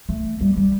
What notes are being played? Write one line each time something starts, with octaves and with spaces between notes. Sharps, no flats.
A3
G3
G3